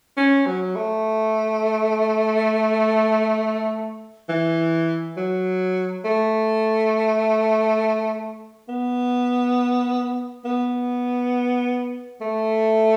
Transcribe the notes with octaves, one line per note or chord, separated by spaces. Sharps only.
C#4
F#3
A3
E3
F#3
A3
B3
B3
A3